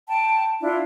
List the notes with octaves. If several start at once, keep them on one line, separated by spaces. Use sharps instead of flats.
G5 A5
D4 E4 F4